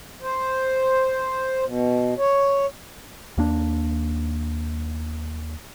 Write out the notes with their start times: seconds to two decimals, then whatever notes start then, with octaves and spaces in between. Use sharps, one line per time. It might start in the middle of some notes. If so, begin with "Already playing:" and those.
0.22 C5
1.64 B2
2.18 C#5
3.37 D#2 A#3 D4